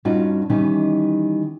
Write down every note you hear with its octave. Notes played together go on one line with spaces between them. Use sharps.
G2 C#4 D#4 F4 F#4
D#3 E3 G3 C#4 D#4